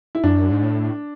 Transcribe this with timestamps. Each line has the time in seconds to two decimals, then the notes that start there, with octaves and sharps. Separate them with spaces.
0.15 E4
0.24 F#2 D4
0.51 G#2
0.63 A2